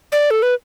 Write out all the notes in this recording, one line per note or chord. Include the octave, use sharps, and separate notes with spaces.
D5
A4
B4